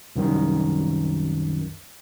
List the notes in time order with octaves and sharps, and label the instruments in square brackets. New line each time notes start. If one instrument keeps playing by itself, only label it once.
[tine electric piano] C2 F#2 D#3